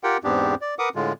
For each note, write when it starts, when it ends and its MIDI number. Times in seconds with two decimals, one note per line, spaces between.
0.04 0.17 65
0.04 0.17 67
0.04 0.17 70
0.04 0.17 78
0.04 0.17 79
0.24 0.55 40
0.24 0.55 44
0.24 0.55 59
0.24 0.55 60
0.24 0.55 62
0.24 0.55 67
0.61 0.74 74
0.79 0.89 70
0.79 0.89 71
0.79 0.89 78
0.79 0.89 86
0.79 0.89 87
0.95 1.13 45
0.95 1.13 50
0.95 1.13 56
0.95 1.13 65